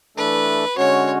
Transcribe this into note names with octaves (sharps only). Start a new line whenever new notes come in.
E3 A3 D4 A4 B4
D3 G#3 C#4 F#4 C#5